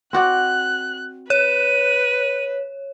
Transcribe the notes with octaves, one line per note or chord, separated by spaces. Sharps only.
C4 F#4 D5 F#6
B4 C#5 D#7